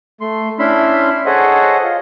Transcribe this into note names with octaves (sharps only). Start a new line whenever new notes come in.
A3 C6
C#4 D4 E4 E5 B5 C6
G#4 A4 C5 C#5 D#5 F#5
F4